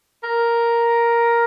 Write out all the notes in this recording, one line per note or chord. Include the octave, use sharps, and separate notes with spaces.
A#4